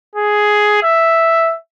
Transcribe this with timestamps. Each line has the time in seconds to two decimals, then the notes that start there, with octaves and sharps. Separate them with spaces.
0.15 G#4
0.83 E5